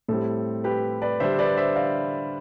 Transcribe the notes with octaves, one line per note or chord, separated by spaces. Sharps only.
A2 G3 C4 A4
G4 B4
B4 D5
D3 G3 D4 C5 E5
B4 D5
C5 E5
D5 F5